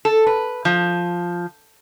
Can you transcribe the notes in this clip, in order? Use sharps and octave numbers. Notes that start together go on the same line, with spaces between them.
A4
B4
F3